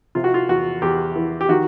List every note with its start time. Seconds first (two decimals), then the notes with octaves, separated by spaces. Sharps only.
0.15 C3 F4
0.24 F#4
0.34 F4
0.49 E2 F#4
0.82 E2 G4
1.16 E3
1.41 G4
1.49 D#3 F#4